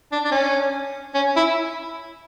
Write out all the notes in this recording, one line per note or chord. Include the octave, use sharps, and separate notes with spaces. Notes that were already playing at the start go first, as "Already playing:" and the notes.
D4
D4
C#4
C#4
E4